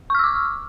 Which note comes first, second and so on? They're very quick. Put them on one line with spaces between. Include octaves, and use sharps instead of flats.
C#6 F6 E6 D6